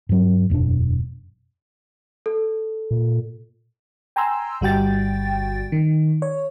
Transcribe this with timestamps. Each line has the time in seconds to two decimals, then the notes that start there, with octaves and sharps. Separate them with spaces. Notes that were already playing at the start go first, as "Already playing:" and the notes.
0.09 G2 F#3
0.50 E1 F#2 B2 D4
2.26 A4
2.91 A#2
4.16 G5 G#5 A#5 C6 E6
4.61 G1 G3 F#4 G5 A6
5.72 D#3
6.22 C#5